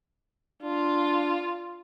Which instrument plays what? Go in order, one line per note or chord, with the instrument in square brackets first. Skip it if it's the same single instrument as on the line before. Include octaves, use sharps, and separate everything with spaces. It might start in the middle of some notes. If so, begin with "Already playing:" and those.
[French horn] D4 [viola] F4